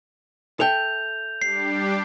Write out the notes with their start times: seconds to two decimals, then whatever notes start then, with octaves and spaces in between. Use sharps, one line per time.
0.60 A4 E5 G5 G6 F7
1.42 G3 D4 G4 C7